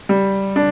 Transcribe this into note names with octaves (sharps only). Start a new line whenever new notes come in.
G3
D4